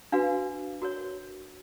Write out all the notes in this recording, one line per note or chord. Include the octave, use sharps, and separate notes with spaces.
D4 F#4 B4 F5
F#4 A#4 C#5